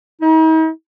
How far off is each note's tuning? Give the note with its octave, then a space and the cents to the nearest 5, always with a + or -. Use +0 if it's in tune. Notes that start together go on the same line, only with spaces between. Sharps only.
D#4 +45